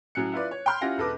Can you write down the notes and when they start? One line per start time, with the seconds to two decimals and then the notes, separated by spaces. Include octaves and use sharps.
0.15 A2 F#3 C#4 F#6 C#7
0.32 E4 F4 B4 D5
0.51 C#5
0.66 G5 B5 C6 F6 G6
0.81 C#4 E4 F4 G4 F#5 A#6
0.97 E1 A4 B4 D6